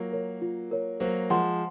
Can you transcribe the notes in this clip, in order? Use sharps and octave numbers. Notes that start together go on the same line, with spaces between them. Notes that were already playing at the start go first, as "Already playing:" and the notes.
Already playing: F#3 A#3 F4
A#4 C#5
F4
A#4 C#5
F#3 A#3 C5
F3 G#3 F#5 C6